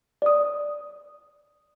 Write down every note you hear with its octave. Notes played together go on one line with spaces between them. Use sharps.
D5 D#6